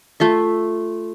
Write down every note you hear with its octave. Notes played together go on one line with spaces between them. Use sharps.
A3 F4 E5